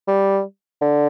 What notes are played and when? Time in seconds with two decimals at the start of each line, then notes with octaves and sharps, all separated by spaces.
0.08 G3
0.82 D3